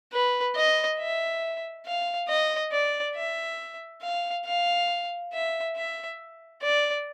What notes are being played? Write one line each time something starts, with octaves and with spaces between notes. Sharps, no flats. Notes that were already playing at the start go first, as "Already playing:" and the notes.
B4
D#5
E5
F5
D#5
D5
E5
F5
F5
E5
E5
D5